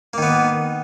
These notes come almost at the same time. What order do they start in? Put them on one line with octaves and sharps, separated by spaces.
A#3 D#3 B3